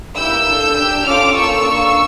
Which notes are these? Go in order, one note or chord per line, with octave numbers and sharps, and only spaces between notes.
A#3 E4 G4 E6 G6
D4 A4
D4 G4
C#4 F4 A4 D6 F6
A#3 C#4 F4 A4 C#6 E6
A#3 D4 F4 A4